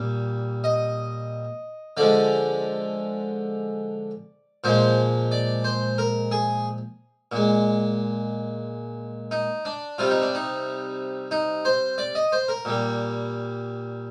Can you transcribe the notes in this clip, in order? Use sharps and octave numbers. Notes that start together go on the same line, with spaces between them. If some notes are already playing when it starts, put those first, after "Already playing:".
Already playing: A#2 G3
D#5
D3 F3 G#3 D5
A#2 F3 G#3 C5
D5
C5
A#4
G#4
A#2 G#3
D#4
D4
C3 G3 F4
D#4
D4
D#4
D#4
C5
D5
D#5
C5
A#4
A#2 G3